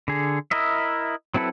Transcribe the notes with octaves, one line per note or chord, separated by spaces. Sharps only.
D3 G#4
E4 A#4 D#5 E5
F#3 C4 E4 A4 B4